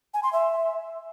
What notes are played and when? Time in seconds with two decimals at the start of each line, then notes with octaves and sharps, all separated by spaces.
0.14 G#5
0.23 C6
0.33 E5